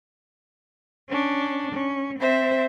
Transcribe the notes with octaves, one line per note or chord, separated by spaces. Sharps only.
C#4 D4
C#4
C4 C5 E5